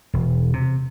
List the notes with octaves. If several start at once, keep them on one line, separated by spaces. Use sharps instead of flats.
E1
C3